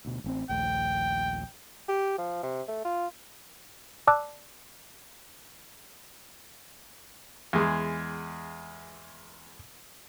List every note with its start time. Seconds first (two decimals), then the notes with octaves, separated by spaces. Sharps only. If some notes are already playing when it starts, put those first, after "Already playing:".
0.05 D2 B2
0.24 A1 B3 C4
0.49 A#1 D#2 A3 G5
1.88 G4
2.18 F3
2.43 C3
2.68 A3
2.85 F4
4.07 D5 A5 D6 E6 F#6
7.53 E2 G#3